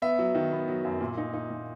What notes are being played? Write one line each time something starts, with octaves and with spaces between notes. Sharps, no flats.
B3 E5
F#3
D#3
B3
F#3
F#2
A#2
D#4
D#4
A#2